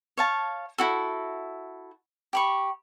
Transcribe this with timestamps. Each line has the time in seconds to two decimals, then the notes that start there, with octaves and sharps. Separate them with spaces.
0.17 C#5 F5 A5
0.78 E4 F#4 A4
2.33 G4 B5 C#6